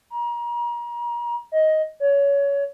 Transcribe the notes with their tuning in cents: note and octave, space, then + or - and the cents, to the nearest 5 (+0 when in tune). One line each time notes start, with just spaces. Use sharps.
A#5 +35
D#5 +10
C#5 +20